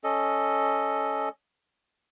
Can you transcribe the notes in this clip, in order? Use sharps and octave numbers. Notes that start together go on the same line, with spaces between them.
C#4 A4 D#5